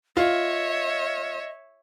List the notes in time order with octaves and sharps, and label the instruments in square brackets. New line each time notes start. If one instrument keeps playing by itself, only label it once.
[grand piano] F4 [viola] C#5 E5 [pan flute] D#5